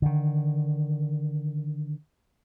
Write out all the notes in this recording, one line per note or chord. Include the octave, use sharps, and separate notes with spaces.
D3 D#3